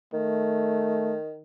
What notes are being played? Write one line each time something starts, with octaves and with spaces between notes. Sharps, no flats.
D#3 A3